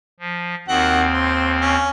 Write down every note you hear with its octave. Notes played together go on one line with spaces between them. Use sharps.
F3
D#2 D#3 C4 F#4 F#5
C5
C#4